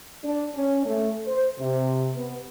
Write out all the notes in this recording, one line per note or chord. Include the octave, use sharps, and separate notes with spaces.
D4
C#4
A3
C5
C3
B3